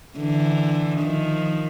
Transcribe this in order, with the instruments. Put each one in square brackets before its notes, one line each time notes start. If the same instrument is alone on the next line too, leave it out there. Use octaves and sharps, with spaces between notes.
[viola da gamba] D3 E3
D#3 F3